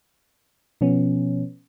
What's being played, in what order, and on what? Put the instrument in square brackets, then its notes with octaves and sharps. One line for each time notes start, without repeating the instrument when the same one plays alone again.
[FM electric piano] B2 F3 B3 C#4